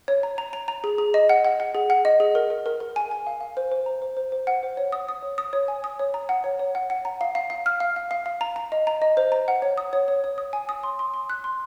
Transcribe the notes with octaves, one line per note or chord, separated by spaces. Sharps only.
C#5
A#5
A#5
A#5
A#5
G#4
G#4
D#5
F#5
F#5
F#5
G#4
F#5
D#5
G#4
A#4
A#4
A#4
A#4
G#5
G#5
F5
F5
C5
C5
A#5
C5
C5
C5
F#5
C5
C#5
D#6
D#6
C#5
D#6
C#5
G#5
D#6
C#5
A#5
F#5
C#5
C#5
F#5
F#5
A#5
F5
F5
F5
F6
F5
F5
F5
F5
A#5
A#5
D#5
A#5
D#5
C5
A#5
F#5
C#5
D#6
C#5
C#5
C#5
D#6
G#5
D#6
C6
C6
C6
F#6
C6